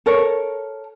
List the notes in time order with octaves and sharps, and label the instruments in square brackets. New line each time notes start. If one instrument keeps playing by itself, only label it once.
[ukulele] A4 A#4 C#5